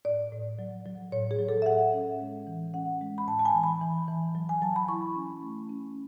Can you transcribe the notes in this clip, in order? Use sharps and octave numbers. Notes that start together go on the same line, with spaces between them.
A2 D5
A2
F#3
F#3
A2 C#5
G#4
F#3
A4
E5
A2 F#5
C#4
G#3
E3
C#4 F#5
G#3
B5
A2 A5
A5
G#5
E3
B5
E3
E3
F#3
G#5
F#3 A5
B5
E4 C#6
C#4
A3
C#4